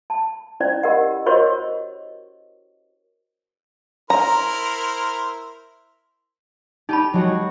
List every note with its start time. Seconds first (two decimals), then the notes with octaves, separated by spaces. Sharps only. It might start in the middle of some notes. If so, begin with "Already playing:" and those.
0.10 A5
0.60 C#4 E4 C5 D5
0.83 G4 A#4 D#5 F#5
1.26 F#4 A#4 C5 C#5 D#5 C#6
4.10 E4 A#4 C5 A#5
6.89 D#4 G4 A5 B5
7.13 F#3 G#3 F#4